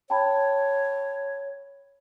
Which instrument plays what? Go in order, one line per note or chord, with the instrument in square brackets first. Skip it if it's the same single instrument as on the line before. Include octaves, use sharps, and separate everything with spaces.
[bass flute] C#5 [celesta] G5 A5 B5